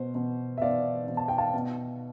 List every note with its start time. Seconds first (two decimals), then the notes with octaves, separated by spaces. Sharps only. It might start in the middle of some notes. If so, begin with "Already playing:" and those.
Already playing: B2 C5
0.15 B2
0.57 E5
0.61 B2 D5 F5
1.08 B2
1.17 A5
1.28 G5
1.38 F5 A5
1.53 B2